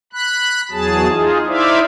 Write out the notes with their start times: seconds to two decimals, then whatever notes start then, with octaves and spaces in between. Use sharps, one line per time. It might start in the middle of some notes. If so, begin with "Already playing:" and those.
0.13 B5 F#6
0.71 E2 F#3 G#4 A5
1.09 D#4 F4 G#4
1.47 D#4 E4 C5 D5 E5 F5